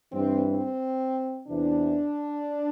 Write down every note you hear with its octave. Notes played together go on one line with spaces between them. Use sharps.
G2 E3 C4
C4
E2 C3 E3 D4